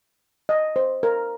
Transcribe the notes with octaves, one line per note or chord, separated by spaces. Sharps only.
D#5
C5
A#4